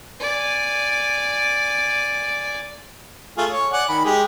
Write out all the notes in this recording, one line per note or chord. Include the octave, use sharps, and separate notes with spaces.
D5 G#5
A3 F4 G#4
C#5
D5 F#5 G#5
D#3 B5
G#3 G4 G#4